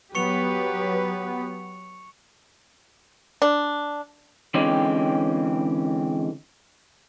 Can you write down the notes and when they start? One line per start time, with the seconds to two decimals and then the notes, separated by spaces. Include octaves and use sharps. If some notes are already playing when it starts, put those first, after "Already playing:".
0.15 F#3 B3 G4 B4 C#6 C#7 F7
3.42 D4
4.54 D3 E3 G#3 C4 C#4 G4